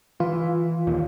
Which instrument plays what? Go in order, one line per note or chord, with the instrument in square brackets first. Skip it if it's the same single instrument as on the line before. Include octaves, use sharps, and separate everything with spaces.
[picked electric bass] E3 [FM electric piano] F4
[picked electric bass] D#2 A#2